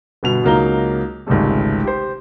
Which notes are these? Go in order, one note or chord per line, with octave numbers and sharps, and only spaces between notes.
G1 B2 F7
C#2 F#3 A#3 D#4 A#5 G7
G#1 C#2 C3 G3 A3
G4 C5